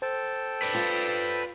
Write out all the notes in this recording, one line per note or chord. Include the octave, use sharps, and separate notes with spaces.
A4 C5 G5 A5
B4 D5
F4